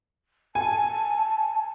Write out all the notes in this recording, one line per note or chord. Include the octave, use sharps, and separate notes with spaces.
G#5 A5